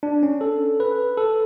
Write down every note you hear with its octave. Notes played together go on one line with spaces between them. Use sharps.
D4
C#4
A4
B4
A4